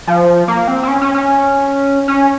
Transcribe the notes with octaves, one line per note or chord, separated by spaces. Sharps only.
F3
A#3
C4
C4
C#4
C#4
C#4
C#4